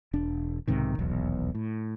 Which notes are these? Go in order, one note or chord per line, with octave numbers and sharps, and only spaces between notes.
E1 D4
B1 G#2 C3 D#3
D#1 B1 E2
A2